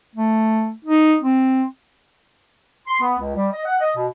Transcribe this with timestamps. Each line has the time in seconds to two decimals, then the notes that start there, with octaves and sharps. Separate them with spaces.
0.15 A3
0.85 D#4
1.22 C4
2.88 C6
3.01 B3
3.19 C#2
3.36 G3
3.52 D#5
3.66 F#5
3.81 D#5
3.96 B2